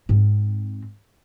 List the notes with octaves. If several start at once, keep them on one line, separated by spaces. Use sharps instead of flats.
G#2 C4